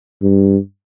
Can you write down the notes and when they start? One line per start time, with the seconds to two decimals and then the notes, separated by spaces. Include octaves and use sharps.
0.22 G2